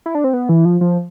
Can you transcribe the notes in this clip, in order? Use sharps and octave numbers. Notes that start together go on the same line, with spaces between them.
E4
D4
C4
B3
E3
F3
F3